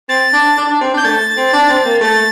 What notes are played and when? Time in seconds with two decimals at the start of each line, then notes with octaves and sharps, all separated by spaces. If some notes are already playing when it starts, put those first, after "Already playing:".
0.09 C4 A6
0.33 D4
0.58 D4
0.69 D4
0.81 C4
0.94 D4
0.97 G6
1.05 A3 A6
1.37 C4
1.53 D4
1.69 C4
1.85 A#3
2.01 A3 A6